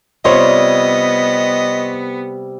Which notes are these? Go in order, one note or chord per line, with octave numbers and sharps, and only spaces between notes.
C3 G3 B3 F4 C#5 D#5 C6